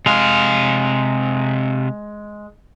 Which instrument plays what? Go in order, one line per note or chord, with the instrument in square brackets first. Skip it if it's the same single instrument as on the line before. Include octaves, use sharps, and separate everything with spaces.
[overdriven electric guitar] C3 F5 [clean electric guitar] G#3